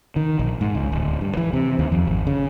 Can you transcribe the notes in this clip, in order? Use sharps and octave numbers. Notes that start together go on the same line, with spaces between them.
D#3
A#1
G#2
C#2
D1
G2
E3
C3
D#2
F2
G#1
C#3